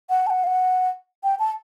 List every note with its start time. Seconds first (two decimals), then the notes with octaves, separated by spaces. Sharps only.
0.10 F#5
0.27 A5
0.30 F#5
0.44 F5
0.47 F#5
1.24 G5
1.39 A5